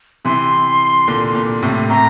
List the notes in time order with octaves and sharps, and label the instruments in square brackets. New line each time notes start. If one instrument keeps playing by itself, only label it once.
[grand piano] C3 E3 [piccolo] C6
[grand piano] A#2 D3
A#2
A2 C3
[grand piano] A2 C3 [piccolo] A#5